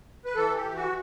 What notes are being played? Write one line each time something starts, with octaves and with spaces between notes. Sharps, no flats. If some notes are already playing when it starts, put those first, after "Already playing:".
B4
E3 A4
G4
E3
F#4